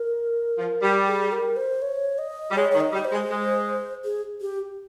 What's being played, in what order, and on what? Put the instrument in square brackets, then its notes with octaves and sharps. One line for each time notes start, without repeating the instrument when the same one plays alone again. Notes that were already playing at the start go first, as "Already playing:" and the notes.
Already playing: [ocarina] A#4
[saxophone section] F3
G3
[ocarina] G#4
A#4
C5
C#5
D#5
[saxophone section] G3
[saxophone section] G#3 [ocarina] C#5
[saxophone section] D#3 [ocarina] C#5
[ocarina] D#5
[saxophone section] G3
[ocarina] C5
[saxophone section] G#3
G#3
[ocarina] G#4
G4